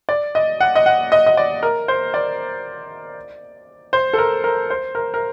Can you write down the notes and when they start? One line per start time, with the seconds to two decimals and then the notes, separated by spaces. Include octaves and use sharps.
0.09 D5
0.35 D#5
0.60 F#5
0.75 D#5
0.86 F#5
1.12 D#5
1.26 D#5
1.37 D5
1.63 A#4
1.88 C5
2.14 D5
3.93 C5
4.13 A4
4.18 A#4
4.44 A#4
4.70 C5
4.95 A#4
5.14 A#4